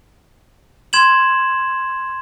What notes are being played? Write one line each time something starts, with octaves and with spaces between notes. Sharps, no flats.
C6 G#6 E7 F#7